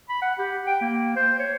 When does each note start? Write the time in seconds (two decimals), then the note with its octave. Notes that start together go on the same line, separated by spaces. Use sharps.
0.09 B5
0.22 F#5
0.39 G4
0.67 G5
0.81 A#3
1.16 C5
1.39 C#5